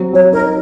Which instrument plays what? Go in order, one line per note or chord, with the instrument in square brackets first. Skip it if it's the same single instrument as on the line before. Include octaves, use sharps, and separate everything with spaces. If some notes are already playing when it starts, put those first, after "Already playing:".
Already playing: [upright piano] F#3 C4
[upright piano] F#3 [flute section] C#5
[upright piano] D#4 [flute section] A#4